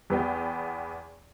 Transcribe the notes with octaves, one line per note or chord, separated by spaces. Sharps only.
E2 B3 G5